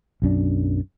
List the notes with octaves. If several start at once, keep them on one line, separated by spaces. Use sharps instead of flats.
B1 F#2 D4